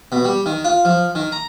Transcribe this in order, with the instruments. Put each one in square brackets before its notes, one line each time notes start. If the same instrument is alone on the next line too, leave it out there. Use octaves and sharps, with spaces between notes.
[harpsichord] B2
G3
D#3
F4
F3
D#3
A#5